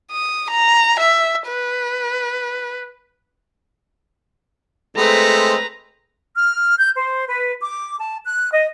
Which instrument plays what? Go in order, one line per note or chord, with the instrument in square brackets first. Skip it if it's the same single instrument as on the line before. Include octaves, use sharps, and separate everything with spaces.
[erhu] D#6
A#5
E5
B4
[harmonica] G#3 A3 C4 [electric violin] B4 A#5
[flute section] F6
G6
C5
B4
D6
A5
F#6
D#5